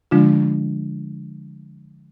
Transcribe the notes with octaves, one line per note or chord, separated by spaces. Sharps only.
D3 F3 G#3 D4 F4